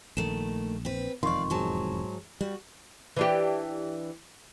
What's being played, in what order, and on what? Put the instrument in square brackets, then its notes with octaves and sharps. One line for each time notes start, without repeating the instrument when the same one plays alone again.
[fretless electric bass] A#1 [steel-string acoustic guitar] D#3 A3 [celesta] E7
[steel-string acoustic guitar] C4 B4
[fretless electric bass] E1 F2 D#3 [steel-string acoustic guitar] D5 F5 [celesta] C6 C#6
[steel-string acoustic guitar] G#2 F#3 A5
[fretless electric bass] G3 [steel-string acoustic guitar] F#4
[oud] E3 D4 G4